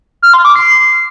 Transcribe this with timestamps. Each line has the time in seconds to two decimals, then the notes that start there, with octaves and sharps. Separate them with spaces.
0.22 F6
0.34 C6
0.45 D6
0.56 C7